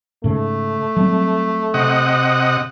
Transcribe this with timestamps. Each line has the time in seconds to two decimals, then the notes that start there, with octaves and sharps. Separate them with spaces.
0.24 G#2 C#3 A3
0.97 F#3 G3 C4
1.74 C3 D#5 F#5